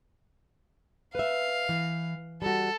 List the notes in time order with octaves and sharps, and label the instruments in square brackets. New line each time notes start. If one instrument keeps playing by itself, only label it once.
[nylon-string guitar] B4 E5 [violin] F5
[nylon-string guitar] E3
[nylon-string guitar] G3 F#4 [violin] A4